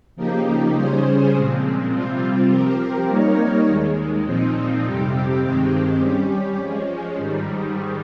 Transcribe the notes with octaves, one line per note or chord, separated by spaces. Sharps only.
C#3 F3 A#3 D#4 G4
C#3 G3 C#4 G#4 C5
A#2 F3 G#3 C4
C3 G3 C4 F4
F3 C4 G4 A#4
G3 A#3 D#4 A#4 C#5
D#2 D#3 G#3
A#2 F3 C4 D#4
F2 C3 G3 C4 G4
G2 D#3 G#3 C4 G4
G3 C#4 G4
F3 G#3 C#4
G#2 D#3 G3